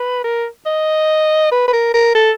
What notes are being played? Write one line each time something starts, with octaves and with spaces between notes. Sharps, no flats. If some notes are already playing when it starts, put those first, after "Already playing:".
Already playing: B4
A#4
D#5
B4
B4
A#4
A#4
A4